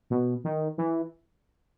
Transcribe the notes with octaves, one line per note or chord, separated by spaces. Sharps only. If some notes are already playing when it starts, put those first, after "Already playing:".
B2
D#3
E3